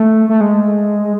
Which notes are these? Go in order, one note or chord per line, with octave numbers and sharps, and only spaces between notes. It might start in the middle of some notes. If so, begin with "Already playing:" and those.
Already playing: A3
A3
G#3